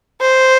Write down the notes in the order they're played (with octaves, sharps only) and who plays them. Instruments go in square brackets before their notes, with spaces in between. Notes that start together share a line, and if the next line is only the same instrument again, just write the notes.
[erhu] C5